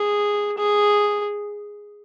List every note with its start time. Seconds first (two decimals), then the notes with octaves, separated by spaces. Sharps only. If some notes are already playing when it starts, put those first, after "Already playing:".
Already playing: G#4
0.57 G#4